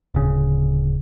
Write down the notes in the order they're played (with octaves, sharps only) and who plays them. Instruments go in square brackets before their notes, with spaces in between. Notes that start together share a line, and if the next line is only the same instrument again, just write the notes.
[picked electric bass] D1 C#3